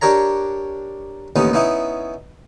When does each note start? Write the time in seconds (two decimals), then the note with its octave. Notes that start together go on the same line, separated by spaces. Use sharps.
0.01 D4 G4 A#4 C#5 A#5
1.36 A1 D#2 B3 C#4 D#4
1.53 B3 C#4 D#4 E4